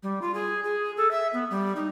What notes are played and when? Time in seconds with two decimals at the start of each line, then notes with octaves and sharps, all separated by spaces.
0.03 G3
0.22 F4
0.34 G#4
0.64 G#4
0.97 A4
1.11 E5
1.33 B3
1.50 G3
1.76 D#4